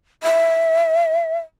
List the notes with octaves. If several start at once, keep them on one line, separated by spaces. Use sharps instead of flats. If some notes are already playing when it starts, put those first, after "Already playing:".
E5